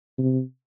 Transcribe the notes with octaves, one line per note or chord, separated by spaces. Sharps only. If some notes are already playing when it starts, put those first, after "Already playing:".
C3